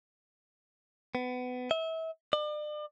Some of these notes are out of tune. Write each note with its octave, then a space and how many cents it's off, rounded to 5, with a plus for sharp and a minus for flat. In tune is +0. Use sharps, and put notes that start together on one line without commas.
B3 +25
E5 -30
D5 +40